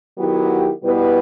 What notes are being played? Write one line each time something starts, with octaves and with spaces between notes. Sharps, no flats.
D#3 F#3 B3 E4 G4
B2 G3 B3 E4 B4